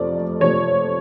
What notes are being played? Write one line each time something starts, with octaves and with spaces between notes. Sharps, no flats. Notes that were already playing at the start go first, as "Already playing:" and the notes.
Already playing: F2 C3 F3 A3 D5
F2 C3 F3 A3 C#5